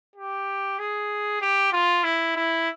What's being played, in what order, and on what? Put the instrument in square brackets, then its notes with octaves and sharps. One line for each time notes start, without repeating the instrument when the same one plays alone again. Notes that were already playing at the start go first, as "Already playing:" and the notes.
[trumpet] G4
G#4
G4
F4
E4
E4